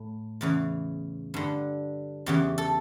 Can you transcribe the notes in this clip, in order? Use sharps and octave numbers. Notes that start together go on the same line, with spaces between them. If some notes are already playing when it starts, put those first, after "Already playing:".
Already playing: A2
E2 C#3 E3
G2 D3
E2 C#3 E3 G4
A4